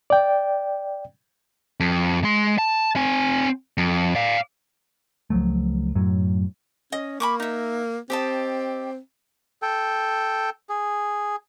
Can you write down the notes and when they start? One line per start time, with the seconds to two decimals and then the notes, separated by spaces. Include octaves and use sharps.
0.10 D5 G5
1.80 F2
2.24 G#3 C6
2.58 A5
2.96 C4 G#5
3.78 F2
4.15 D5 F5
5.30 C#2 F3 F#3 A3
5.95 F#2 A2 F#3
6.92 C#4 D#5
7.20 A#3 B5 C#6 D6
7.40 D#4 E5
8.10 C4 G4 D#5 A5
9.62 A4 G5
10.69 G#4